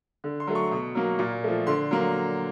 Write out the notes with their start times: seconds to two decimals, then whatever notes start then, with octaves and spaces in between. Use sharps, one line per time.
0.24 D3
0.40 C6
0.47 F#3 A3
0.55 C#6
0.72 B2
0.95 F#3 A#3
1.19 A#2
1.44 F3 A3
1.67 D3 C6
1.91 F#3 A#3